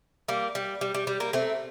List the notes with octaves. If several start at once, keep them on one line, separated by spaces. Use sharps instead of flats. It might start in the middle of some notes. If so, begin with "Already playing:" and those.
G3 A#3
G3
G3
G3
G3
G3 A#3
A3 C4